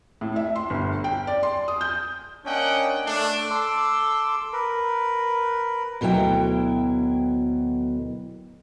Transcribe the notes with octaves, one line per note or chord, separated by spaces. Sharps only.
A2
E5
C6
G1
G5
D5
C6
D#6
G6
A#3 C#4 D4 D#5 F#5 G5
A3 D4
A4 C6 D6 E6
A#4 B4
D2 B2 F#3 E4 G5